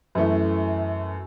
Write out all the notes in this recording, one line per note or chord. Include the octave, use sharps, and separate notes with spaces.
F#2 E3 A3